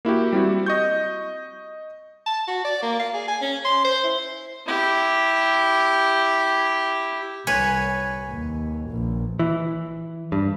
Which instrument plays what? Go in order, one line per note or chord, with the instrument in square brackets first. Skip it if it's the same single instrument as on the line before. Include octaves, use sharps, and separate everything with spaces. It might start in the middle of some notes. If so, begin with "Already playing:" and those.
[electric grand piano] A#3 E4 F#4 G4
G3 C4 E4 F#4
D#5 C#6 G6
[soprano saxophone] A5
F#4
D5
A#3
F5
G#4
G#5
C#4
C6
C5
E4
[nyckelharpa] E4 G4
[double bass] C2 [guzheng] B4 C#5 G#5
[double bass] D#2
A#1
[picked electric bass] E3
G2